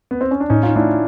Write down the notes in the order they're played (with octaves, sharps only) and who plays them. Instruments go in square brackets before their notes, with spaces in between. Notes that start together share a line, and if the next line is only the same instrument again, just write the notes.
[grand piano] B3
C4
C#4
D4
[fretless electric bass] A2 [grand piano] C#4 D#4
[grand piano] D#4 F4
[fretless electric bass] A3 [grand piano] D4 E4